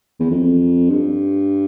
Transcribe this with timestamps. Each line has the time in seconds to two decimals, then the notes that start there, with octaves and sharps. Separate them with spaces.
0.20 E2
0.31 F2
0.90 G2